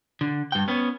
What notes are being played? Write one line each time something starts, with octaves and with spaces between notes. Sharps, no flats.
D3
G2 G5
B3 C#4